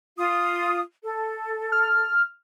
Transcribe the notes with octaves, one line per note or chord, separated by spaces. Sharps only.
F4 D#6
A4
F6